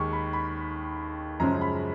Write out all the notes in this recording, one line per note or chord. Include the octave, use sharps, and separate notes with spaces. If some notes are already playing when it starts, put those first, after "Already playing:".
Already playing: D#2 D#3 G#3 C#6
B5
B5
F#2 C#3 F3 G#3 C#4 A#5
B5